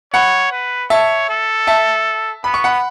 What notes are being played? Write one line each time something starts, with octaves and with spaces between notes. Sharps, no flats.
C#5 F#5 B5
B4
C#5 E5 A5
A4
E5 A5
B3 B5
C#6
F#5 B5